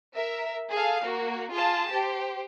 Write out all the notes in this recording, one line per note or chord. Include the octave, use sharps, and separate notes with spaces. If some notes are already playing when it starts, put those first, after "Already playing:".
A#4 E5
G#4 A4 F5
A#3 F#4
F4 G#4 A5
G4 C5